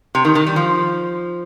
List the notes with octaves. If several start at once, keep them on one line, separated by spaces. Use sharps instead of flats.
C3
D#3
D#3
G3
F3